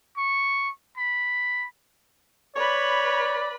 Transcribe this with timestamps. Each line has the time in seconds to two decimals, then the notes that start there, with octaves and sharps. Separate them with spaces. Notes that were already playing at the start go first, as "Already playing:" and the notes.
0.17 C#6
0.97 B5
2.56 B4 C#5 D5 B5